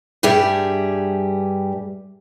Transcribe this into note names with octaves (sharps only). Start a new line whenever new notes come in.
G2 G3 G4 G#4 E5